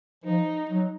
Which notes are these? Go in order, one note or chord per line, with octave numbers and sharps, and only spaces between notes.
F3 D#4
F#3